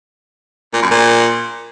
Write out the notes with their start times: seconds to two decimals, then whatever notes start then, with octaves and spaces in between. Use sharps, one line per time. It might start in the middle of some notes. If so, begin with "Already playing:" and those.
0.73 A#2
0.82 F#2
0.91 A#2